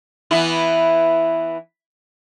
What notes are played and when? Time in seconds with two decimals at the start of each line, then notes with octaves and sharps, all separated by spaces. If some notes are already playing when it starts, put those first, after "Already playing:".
0.31 E3 B3 E4